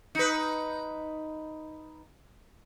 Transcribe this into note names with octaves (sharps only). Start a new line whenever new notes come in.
D#4 B4